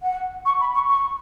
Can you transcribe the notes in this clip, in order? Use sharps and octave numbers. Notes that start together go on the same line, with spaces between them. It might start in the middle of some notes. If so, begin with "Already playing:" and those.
F#5
C#6
B5
C#6
C#6